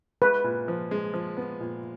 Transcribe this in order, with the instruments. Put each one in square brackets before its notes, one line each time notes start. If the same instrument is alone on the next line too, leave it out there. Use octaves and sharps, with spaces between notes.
[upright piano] G#3 [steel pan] B4
[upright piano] A#2
F3
G#3
F3
B3
A#2